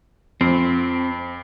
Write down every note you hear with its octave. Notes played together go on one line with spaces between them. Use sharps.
F2 C4